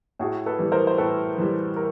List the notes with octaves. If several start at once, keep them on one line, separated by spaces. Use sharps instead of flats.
A2 F#4 G#4
A4 B4
E3 G3
A#4 C5
C5
A2 A4 B4
E3 G3
A#4